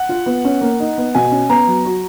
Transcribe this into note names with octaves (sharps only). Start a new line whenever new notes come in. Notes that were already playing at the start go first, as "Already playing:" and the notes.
Already playing: F#5
F4
B3
C#4
A#3
D#4
B3
B2 G#5
C#4
B3 A#5
F#3
F#4